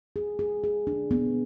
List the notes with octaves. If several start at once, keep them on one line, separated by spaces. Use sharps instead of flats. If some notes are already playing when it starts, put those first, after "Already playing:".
G#4
G#4
G#4
D4
B3